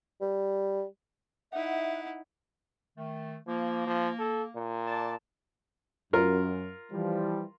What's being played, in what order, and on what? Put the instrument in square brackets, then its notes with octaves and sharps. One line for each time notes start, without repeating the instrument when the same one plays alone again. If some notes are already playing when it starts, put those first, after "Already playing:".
[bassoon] G3
[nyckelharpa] D#4 E4 [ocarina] E5 [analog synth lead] F#5
[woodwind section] D#3 A3
[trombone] F3 [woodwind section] A#3
[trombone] F3
A4
A#2
[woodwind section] D5 A5
[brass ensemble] F#2 [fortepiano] F4 A#4
[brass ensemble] E3 F3 G3